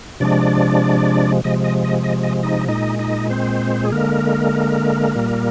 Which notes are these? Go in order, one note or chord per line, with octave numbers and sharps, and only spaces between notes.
C3 F3 G#3 D4 D5
C3 F3 G#3 D#5
D#5
D#5
D#5
D#5
D#4 D#5
A#2 G#3 D#4 D#5
D#4 D#5
C4 C5
G#4
D3 G#3 A#3 A#4
A#2 G3